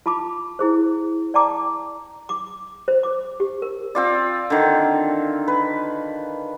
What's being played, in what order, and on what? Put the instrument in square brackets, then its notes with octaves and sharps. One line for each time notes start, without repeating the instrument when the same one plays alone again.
[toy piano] F4 A5 B5 D6
E4 G#4 C5
D5 G5 A5 A#5 D6
D6
C5
D6
G4
A#4
[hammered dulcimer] C4 F4 D5
D3 D#3
B4